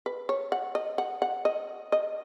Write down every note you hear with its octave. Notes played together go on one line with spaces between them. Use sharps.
B4
C#5
F#5
D#5
F#5
F#5
D#5
D#5